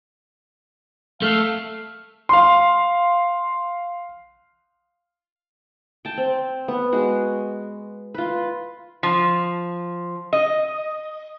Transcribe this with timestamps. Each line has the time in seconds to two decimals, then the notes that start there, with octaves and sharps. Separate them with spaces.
1.22 A3 F5
2.29 F5 C6
6.05 G5 A5
6.17 C4
6.68 B3
6.92 G#3 F#4
8.14 F4 B4
9.03 F3
10.33 D#5